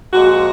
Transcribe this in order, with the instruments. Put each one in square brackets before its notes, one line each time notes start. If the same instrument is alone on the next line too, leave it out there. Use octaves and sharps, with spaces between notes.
[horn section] A#2 F3 G#3 F#4